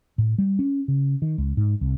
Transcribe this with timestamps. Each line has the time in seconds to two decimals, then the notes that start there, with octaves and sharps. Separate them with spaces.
0.18 A2
0.38 G3
0.59 C#4
0.88 C#3
1.22 D#3
1.38 C#2
1.57 G#2
1.81 C2